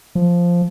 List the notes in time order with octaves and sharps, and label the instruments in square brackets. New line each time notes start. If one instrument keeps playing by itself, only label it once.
[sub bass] F3